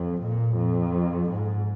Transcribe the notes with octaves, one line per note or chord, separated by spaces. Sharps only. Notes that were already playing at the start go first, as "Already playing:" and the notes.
Already playing: F2
A#2
F2
G#2